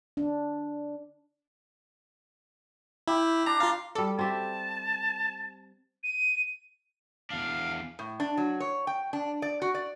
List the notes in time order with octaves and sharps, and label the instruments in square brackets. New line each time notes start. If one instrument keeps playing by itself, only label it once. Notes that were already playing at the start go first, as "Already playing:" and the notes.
[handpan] D4
[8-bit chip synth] E4 [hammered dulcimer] G4 B5
[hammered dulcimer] D4 [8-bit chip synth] A#5
[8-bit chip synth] F4 F5 [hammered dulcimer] A#5
[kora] G3 D5 [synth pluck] A4
[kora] C4 G4 E5 [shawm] A5
[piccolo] D#7
[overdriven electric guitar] E2 D4 [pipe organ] F5
[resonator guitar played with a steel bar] A2
D4
F#3
C#5
G5
D4
D5
F#4
D5